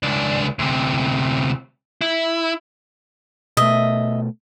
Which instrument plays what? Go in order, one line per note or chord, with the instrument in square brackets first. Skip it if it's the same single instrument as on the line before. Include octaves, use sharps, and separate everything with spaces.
[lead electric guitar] C#2 D4
D2 C3
E4
[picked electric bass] B2 A3 [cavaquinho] D#5 E5